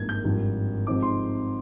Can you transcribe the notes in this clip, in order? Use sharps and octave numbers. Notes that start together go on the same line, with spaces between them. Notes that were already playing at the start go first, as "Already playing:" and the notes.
Already playing: G#1 G2 F3 A#3 D#4 G#6
G6
G#1 G2 F3
G#2 F3 C4 D#4 D6
C6